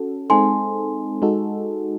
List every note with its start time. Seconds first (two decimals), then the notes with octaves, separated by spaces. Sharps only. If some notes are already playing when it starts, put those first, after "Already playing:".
Already playing: C#4 F#4 A4
0.30 G#3 C4 D#4 A4 G#5 C6
1.22 G#3 D#4 F#4 A4